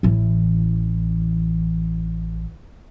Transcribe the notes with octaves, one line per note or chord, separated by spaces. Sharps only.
A1 E3